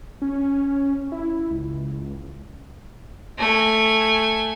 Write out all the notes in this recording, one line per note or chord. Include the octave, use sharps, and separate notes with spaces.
C#4
E4
C#2
A3 G#5